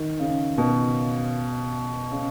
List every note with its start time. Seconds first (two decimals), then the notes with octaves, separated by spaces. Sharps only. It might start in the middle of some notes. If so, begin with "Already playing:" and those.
Already playing: D#3
0.19 C#3
0.58 B2
2.11 C#3